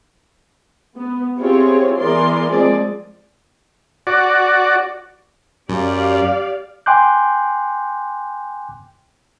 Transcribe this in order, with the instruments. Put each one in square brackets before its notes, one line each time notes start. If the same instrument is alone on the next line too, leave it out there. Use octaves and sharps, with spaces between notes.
[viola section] B3
C4 E4 F4 G4 G#4 C#5
E3 B3 G#4 A#4 D5 C6
F3 G#3 A#3 C4 G#4 D5
[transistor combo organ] F#4 D5
[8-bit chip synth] F#2 [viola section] G4 D5 F5
[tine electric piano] G5 G#5 C6 D6 F#6 G6